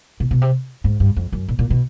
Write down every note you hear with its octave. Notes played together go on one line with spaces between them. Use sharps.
B2
B2
C3
G#2
G2
F2
F#2
A#2
A#2
B2